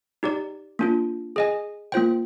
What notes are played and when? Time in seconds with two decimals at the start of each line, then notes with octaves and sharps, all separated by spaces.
0.23 D#4 G4 D5
0.79 A#3 D4 F4
1.36 G#4 D#5 G#5
1.92 A#3 F4 C5 G5